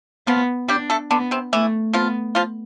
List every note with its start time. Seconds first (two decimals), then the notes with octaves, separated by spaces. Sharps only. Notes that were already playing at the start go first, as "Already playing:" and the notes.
0.27 F3 B3 F4
0.68 G3 D4 G4
0.90 A3 A4
1.11 D3 B3 D4
1.31 C3 C4
1.52 E3 A3 E4
1.93 F3 B3 F4
2.35 F3 F4